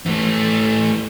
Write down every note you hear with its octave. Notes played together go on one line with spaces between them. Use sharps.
E3 A3